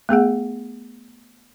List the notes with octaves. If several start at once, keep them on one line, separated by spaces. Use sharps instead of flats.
A3 B3 G#4 F#5